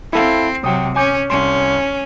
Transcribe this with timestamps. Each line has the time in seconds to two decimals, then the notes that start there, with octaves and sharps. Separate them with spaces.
0.13 C4 E4 A4 F5
0.64 C3 F#3 G5 D#6
0.96 C#4 G#5 D6 G6
1.30 C2 C#4 C6